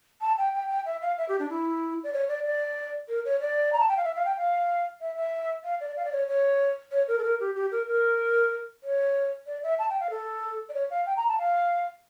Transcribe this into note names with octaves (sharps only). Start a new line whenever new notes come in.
A5
G5
G5
G5
E5
F5
E5
G4
D4
E4
D5
C#5
D5
D5
A#4
C#5
D5
A#5
A5
G5
F5
E5
F5
G5
F5
E5
E5
F5
D5
F5
D5
C#5
C#5
C#5
A#4
A4
A#4
G4
G4
A#4
A#4
C#5
D5
E5
A5
G5
F5
A4
D5
C#5
F5
G5
A#5
A5
F5